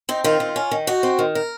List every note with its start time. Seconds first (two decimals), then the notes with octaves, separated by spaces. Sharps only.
0.09 C4 D#4
0.24 D#3 F4
0.40 D#3
0.56 C#4
0.71 D#3
0.87 D#4 F#4
1.03 C4
1.19 D#3
1.35 A#4